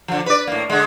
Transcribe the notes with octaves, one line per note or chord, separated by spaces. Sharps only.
D3 F3
B4 D5
A2 A#3
D3 G#3